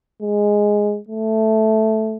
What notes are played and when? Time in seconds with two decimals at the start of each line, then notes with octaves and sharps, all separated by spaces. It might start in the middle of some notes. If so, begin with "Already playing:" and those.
0.22 G#3
1.08 A3